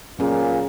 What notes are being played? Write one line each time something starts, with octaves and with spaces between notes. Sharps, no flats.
A#2 F#3 C#4 G#4